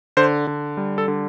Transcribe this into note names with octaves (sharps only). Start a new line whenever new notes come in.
D3 C5
D3
G3
A4
D3